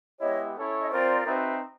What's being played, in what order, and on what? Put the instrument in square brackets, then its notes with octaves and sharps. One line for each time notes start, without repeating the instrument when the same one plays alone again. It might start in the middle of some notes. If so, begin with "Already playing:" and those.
[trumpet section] G#3 B3 E4 G4 [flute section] C#5 D#5
[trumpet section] C#4 E4 A4 C#5
[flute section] D#5
[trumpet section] C4 F4 A#4 [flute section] C5 D5
[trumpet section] C4 D#4 F#4 B4 E5